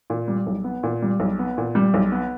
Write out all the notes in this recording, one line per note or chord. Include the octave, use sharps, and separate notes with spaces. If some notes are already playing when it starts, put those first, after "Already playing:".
A#2
G3
B1
B3
A#2
G3
B1
B3
A#2
G3
B1
B3